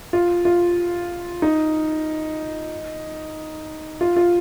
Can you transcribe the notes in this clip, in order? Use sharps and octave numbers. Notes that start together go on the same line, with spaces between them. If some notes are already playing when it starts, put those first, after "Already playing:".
F4
F4
D#4
F4
F4